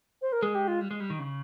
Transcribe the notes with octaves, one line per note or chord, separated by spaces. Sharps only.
C5
A#4
G#3 G#4
G4
F4
G3
G#3
G3
D#3
C#3